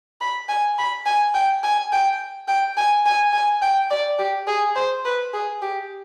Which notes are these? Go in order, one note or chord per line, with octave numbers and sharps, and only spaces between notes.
B5
G#5
B5
G#5
G5
G#5
G5
G5
G#5
G#5
G#5
G5
D5
G4
G#4
C5
B4
G#4
G4